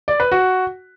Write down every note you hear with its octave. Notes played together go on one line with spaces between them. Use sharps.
D5
B4
F#4